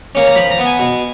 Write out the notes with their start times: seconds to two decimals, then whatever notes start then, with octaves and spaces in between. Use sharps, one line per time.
0.15 A#3 C#4
0.27 A#5
0.36 F3 B5
0.50 A#5
0.58 B3
0.65 G#5
0.79 B2